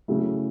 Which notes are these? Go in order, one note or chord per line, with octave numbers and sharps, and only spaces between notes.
C#3 F#3 A3 E4